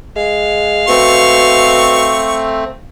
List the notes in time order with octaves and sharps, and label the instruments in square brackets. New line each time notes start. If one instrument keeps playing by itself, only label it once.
[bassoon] G#3 [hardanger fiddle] F5
[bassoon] B2 [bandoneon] A3 C4 [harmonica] C#6